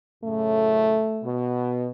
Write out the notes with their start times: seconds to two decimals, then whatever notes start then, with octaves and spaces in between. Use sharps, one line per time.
0.24 F#2 A2 C#3 A3
1.23 B2